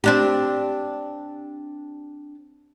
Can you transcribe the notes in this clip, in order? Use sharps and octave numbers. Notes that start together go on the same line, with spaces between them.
C4 D4 G4